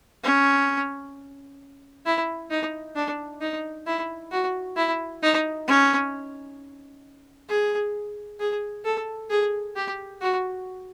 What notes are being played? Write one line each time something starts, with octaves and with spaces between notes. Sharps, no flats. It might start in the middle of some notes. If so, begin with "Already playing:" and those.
C#4
E4
D#4
D4
D#4
E4
F#4
E4
D#4
C#4
G#4
G#4
A4
G#4
G4
F#4